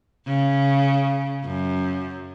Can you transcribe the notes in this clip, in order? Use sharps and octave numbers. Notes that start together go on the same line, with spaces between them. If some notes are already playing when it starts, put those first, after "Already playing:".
C#3
F#2